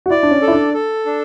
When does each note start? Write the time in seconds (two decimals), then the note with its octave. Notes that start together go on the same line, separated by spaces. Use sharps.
0.06 F#4
0.10 E4 D5
0.23 D4
0.31 C#4
0.42 A4
0.48 E4
0.52 D4
0.74 A4
1.06 D4